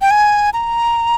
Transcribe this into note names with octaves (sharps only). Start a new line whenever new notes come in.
G5
G#5
A#5